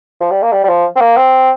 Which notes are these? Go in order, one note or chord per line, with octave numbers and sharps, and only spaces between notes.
F3
G3
A#3
G3
G3
F3
C4
A#3
C4